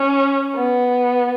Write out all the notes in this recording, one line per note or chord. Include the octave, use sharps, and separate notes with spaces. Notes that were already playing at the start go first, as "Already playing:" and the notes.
Already playing: C#4
B3